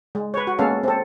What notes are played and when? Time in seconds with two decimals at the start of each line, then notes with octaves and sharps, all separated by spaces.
0.15 G#3
0.34 B4 C#5
0.47 F#4
0.58 G#3 A#3 B3 C#4 A4 F5
0.83 C4 A4